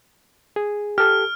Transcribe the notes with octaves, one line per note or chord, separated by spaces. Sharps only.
G#4
G4 A4 F6